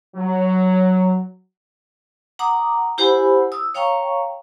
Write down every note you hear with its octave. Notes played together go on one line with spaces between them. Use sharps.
F#3
F#5 A#5 D6 D#6
E4 G4 C5 F#5 G#5 B5
D#6 E6
C#5 F5 G5 A#5 C#6